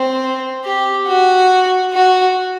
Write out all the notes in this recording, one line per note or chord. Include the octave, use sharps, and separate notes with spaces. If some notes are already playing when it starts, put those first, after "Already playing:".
Already playing: C4
G4
F#4
F#4